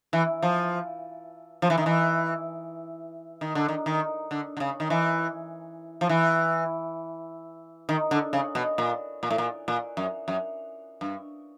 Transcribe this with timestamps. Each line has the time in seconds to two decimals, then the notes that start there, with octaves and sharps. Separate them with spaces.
0.13 E3
0.43 F3
1.62 F3
1.70 E3
1.78 D#3
1.86 E3
3.41 D#3
3.55 D3
3.69 D#3
3.86 D#3
4.31 D3
4.57 D3
4.60 C#3
4.80 D#3
4.90 E3
6.01 F3
6.09 E3
7.89 D#3
8.11 D3
8.33 C#3
8.55 B2
8.78 A#2
9.23 A#2
9.31 A2
9.38 A#2
9.68 A#2
9.97 F#2
10.28 F#2
11.01 G2